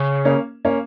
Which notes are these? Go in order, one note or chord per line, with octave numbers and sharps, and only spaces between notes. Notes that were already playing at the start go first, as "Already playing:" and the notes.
Already playing: C#3
A#3 C#4
A#3 C#4